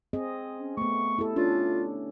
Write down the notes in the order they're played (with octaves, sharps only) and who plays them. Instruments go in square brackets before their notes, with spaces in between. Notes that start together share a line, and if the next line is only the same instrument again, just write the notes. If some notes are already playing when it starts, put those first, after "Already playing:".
[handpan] C4 G#4 D#5
[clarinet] C#4
[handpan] A3 B3 [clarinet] C#6
[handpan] E4 G4 A4
[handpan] C#4 D4 C#5 [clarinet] F4